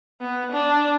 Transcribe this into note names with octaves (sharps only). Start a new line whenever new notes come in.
B3
D4